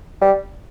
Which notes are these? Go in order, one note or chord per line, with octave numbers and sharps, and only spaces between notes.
G3